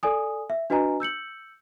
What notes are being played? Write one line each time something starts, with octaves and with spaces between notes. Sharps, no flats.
A4 D5 G#5 D#6
E5
D4 F#4 B4 D#5 G#5 A#5
E6 G6 C#7 F#7